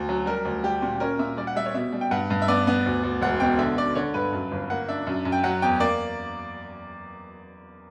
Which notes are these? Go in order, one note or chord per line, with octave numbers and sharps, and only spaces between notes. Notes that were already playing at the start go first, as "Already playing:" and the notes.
Already playing: D2
F#3
G3 A#4
D2
G3 G4
A#2
C#4 A#4
A#2 E5
G3 D5
F#5
G3 E5
C#5
B2 E5
G3
G5
G2 F#5
G2
E5
B3 D5
B3
D2
D2
E1 F#5
B2 G5
D3 E5
D3 D5
D3 C#5
G2 B4
F#2
G1
A#3 F#5
D4 E5
F#2
F#2
G5
F#3 F#5
E2 G5
A#3 D5